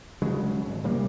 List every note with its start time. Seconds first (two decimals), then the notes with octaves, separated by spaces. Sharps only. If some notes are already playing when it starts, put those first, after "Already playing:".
0.22 D2 C#3 F#3 G#3
0.66 G#1
0.83 A2 C3 G3 A#3